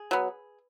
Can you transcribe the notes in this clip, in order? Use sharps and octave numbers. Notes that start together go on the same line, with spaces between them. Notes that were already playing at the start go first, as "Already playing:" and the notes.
Already playing: G#4
F#3 B3